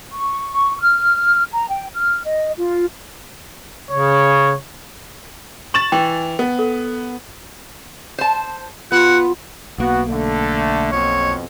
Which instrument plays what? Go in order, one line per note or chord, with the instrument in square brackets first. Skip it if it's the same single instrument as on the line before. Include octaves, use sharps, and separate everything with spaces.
[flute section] C#6
F6
A#5
G5
F6
D#5
F4
[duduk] C#3 [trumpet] C#5
[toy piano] C#6 [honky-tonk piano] A6 E7 F#7
[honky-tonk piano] E3 [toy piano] G5
[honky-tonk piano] B3
[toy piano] A4
[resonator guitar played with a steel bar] C5 A5
[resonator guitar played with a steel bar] B3 [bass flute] F4 [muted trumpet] F#5
[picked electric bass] B1 A#3 [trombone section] B3 F#4
[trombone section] D3 A3
[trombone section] F2 B2 [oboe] C#5